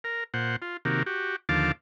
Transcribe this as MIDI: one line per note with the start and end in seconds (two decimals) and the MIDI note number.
0.04 0.24 70
0.34 0.56 46
0.34 0.56 72
0.34 0.56 78
0.62 0.77 65
0.85 1.03 48
0.85 1.03 51
0.85 1.03 58
0.85 1.03 66
0.85 1.03 67
1.06 1.36 66
1.06 1.36 67
1.49 1.72 39
1.49 1.72 50
1.49 1.72 53
1.49 1.72 77
1.49 1.72 81
1.49 1.72 86